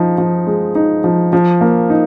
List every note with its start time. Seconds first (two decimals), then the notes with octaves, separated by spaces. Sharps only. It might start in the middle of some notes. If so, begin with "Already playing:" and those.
Already playing: F3 D#4
0.18 F3
0.47 G#3
0.75 D#4
1.04 F3
1.33 F3
1.61 A#3
1.90 D#4